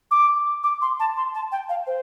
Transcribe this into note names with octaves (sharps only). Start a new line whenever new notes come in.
D6
D6
C6
A5
C6
A5
G5
F5
C5